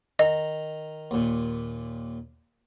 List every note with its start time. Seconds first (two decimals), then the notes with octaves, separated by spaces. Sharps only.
0.19 D#3 D#5 A#5
1.11 D#2 A#2